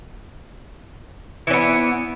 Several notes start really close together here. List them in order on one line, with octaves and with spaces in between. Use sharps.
E3 C#4 B3